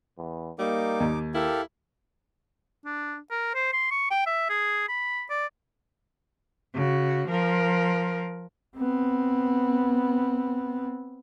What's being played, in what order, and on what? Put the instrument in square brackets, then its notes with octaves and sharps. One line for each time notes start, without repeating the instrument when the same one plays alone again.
[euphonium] E2
[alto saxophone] G3 [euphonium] A#3 [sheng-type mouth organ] D#4 D6
[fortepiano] D#2
[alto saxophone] E4 [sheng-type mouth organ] G4 A4 F5 [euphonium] A#4
[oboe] D4
A#4
C5
C6
C#6
G5
E5
G#4
B5
D5
[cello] C#3 F#4
F3 A#4
[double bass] B3 C4